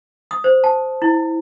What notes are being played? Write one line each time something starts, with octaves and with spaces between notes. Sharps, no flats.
D#6
C5
A5
E4